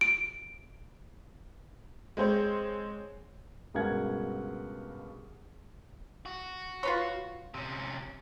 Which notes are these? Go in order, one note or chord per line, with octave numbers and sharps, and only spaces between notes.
D7
G#3 C4 C5 C#5
C#2 G2 B2 A#4 F#5 G#6
F#4
F4 B4 C#5
C3 C#4